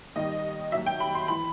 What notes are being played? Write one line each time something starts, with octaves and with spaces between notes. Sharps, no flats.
D#2 D#3 G3 D#5
D#2 D#3 F#3 E5
G5
B5
C6
E3 B5